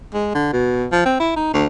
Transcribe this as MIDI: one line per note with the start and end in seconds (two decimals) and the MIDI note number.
0.14 0.33 56
0.35 0.51 50
0.53 0.86 47
0.92 1.05 53
1.05 1.16 60
1.20 1.31 64
1.36 1.52 63
1.54 1.67 38